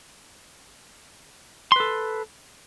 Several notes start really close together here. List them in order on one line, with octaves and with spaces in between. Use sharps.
C6 B4 A4